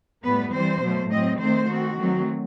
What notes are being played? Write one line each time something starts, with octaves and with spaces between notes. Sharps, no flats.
A2 G3 B3 B4
E3 G3 C4 C5
B2 F#3 A3
A2 F#3 C4 D#5
D#3 A3 C4 C5
D#3 A3 C4 F#4
D#3 F#3 A3 C4